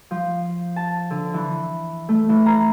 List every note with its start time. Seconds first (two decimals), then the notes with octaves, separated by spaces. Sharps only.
0.11 F3
0.76 A5
1.10 D3
1.34 E3
2.09 A3
2.29 E3
2.46 A#5